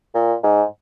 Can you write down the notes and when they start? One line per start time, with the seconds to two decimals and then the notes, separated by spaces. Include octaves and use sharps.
0.14 A#2
0.43 G#2